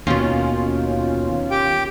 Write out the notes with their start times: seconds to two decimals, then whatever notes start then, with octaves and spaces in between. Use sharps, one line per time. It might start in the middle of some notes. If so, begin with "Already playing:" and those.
0.07 D#2 B2 D#3 C#4 F4
1.51 G4 G5